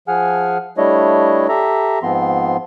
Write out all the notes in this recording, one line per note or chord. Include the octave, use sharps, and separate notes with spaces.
F3 G#4 F#5 G#5 F6
G3 A3 D4 E4 C#5 D#5
G4 A4 E5 A#5
G#2 F3 B3 C4 C6